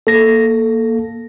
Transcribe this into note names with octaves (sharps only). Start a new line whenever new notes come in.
A#3 A4 A#6